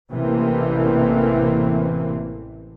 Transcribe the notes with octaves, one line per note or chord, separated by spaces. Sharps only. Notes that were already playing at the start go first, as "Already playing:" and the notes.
A1 C3 E3 A3 A#3 C4